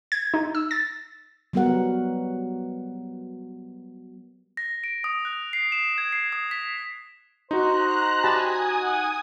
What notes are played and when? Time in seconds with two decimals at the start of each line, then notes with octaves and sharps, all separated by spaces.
0.12 G#6
0.34 D#4
0.55 E6
0.71 A6
1.53 F#3 G3 B3 F#4 A#4 F#5
4.57 A#6
4.84 D7
5.04 D#6
5.25 F#6
5.53 C7
5.72 E7
5.98 G#6
6.12 C7
6.32 D#6
6.51 B6
7.51 D#4 F#4 C5 A#5 F#6
8.24 G4 G#5 A5 B5 D#6
8.82 F#5